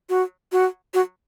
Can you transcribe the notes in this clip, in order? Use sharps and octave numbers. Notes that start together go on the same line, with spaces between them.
F#4
F#4
F#4